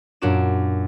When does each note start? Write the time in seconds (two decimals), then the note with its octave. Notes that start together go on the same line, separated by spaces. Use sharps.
0.22 F#2 A#2 D4 F#4 D6 E7